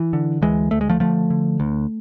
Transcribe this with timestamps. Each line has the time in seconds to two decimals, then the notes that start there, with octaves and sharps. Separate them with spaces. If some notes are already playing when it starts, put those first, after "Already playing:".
Already playing: E3
0.13 D3
0.42 D2 E3 G#3
0.71 D2 A3
0.81 G#3
0.89 F3 A3
1.00 D3 F3 A3
1.30 D3
1.60 D2